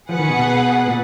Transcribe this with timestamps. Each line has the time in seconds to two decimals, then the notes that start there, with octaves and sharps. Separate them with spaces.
0.09 F3 G#4 B4 F#5
0.19 D#3
0.29 B2
0.39 B2
0.88 A#2